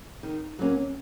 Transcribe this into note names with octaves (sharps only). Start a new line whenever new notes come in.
D#3
F#3 A#3 C#4